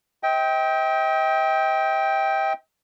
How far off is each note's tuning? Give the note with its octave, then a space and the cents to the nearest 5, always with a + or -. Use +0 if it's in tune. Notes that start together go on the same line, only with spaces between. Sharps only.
C5 +0 D#5 +45 G5 +0